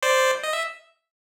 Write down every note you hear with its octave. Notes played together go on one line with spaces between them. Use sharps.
C5 D5
D#5
E5